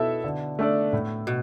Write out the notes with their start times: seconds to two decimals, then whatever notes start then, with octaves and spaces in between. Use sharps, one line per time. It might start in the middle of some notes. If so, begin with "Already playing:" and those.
Already playing: B2 B3 E4 A4 E5
0.24 D3
0.59 A3 D4 A4 D5
0.93 A2
1.27 B2